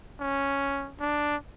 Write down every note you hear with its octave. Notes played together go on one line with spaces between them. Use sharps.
C#4
D4